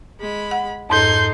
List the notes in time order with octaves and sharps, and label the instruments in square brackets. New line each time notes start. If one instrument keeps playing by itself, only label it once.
[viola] G#3 B5
[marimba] F#5
[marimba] F2 G#2 [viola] D#4 A4 [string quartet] C6 G6